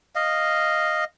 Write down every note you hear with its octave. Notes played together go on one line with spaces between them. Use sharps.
D#5 F5